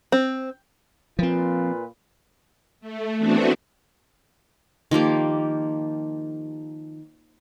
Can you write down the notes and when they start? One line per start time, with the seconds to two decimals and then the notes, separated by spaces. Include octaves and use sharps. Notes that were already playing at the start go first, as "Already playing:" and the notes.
0.12 C4
1.19 A#2 F3 C4 F4 B4
2.81 A3
3.18 E3 A3 B3 C4 D4 F#4
4.91 D#3 F3 A#3 G4